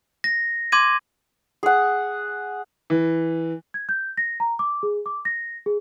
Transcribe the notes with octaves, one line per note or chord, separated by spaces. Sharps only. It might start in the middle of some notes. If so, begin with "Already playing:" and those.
A#6
C6 D6 G#6 D#7
G#4 F#5
E3
G#6
G6
A#6
A#5
D6
G#4
D6
A#6
G#4